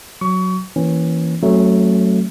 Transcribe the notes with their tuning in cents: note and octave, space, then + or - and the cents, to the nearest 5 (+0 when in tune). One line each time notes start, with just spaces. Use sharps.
F#3 +0 C#6 +25
E3 +0 A#3 +0 C#4 -15
F#3 +10 A3 +0 C#4 -35